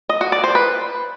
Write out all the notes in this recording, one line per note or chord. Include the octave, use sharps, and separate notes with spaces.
D#5
F#4
D5
C5
B4